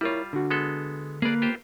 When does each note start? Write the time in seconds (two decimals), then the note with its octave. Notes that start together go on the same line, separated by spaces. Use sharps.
0.01 G3 E4 F4 A#4 C#5
0.33 D3 F#4
0.51 G#3 B3 A4
1.22 A#3 G#4 B4 D5
1.42 F4 G4 C5